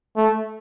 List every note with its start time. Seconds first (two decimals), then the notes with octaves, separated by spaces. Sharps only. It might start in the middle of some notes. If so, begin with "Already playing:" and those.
0.17 A3